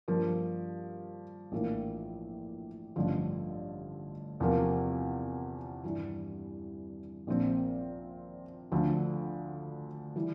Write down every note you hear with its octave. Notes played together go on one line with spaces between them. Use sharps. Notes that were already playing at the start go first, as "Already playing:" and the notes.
G2 F3 A#3
A#1 A2 E3 A#3 D4
A1 G2 D3 F3
E2 C3 F3 A#3
G2 E3 G3 D4
A#1 A#2 F3 C4
D2 D3 F3
E3 G3